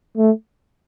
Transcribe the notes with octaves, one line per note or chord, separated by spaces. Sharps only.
A3